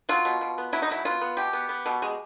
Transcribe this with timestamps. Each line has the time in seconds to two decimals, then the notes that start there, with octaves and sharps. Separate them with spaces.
0.09 F#3 F4
0.25 B2
0.41 B2
0.58 B3
0.73 F#3 E4
0.82 D#4
0.89 F#3 E4
1.05 B3 F4
1.21 B3
1.37 B2 G4
1.53 B3
1.69 B3
1.86 B2
2.02 G#3